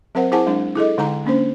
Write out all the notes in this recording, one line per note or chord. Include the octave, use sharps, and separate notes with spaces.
F#3 C4 A#4 C5 F#5
E4 G#4 C5 F#5 G#5 A5
F#3 G#3 D4
E4 G#4 A4 D#5
D3 G#3 D#4 G5 A#5
A#3 C#4 D4 C5